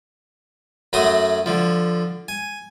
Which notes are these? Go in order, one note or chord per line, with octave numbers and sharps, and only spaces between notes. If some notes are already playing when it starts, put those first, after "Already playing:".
F#2 F#3 A3 F#4 C6 D#6
D3 F3
G#5